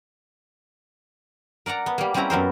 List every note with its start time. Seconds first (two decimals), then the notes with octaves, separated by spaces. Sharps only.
1.66 A#4 D5 F#5 A#5
1.86 B3
1.98 G3 A#3
2.14 G3 C4 C#4 E4 G4 A#5
2.30 F#2 B3 A#4 C5